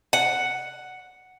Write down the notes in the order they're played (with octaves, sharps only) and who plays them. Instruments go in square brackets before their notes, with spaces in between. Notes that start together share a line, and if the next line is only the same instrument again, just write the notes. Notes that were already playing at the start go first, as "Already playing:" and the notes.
[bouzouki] F#5